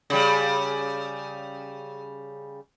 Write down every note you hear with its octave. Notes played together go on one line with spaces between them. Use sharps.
C#3 G3